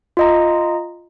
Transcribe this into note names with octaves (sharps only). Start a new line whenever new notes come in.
F4 D#5 A#5